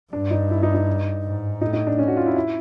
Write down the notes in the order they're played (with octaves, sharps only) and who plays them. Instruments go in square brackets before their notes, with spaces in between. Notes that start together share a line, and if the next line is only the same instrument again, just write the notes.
[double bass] G2 [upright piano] D4
[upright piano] D#4
E4
D#4
D#4
[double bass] G#2
[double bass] A2 [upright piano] D#4
[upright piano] D#4
D4
C#4
F#4
F4
E4
E4